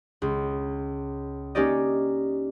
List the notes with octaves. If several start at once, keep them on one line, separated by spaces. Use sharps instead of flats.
C#2
A#3 C#4 D#4 G4 D5 D#5